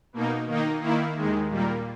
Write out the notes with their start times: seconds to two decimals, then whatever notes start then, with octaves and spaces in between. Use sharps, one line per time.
0.13 B2 A#3 D#4
0.46 D#3 A#3 D#4
0.81 D#3 A#3 E4
1.16 D#2 D#3 G#3
1.50 A#2 G3 A#3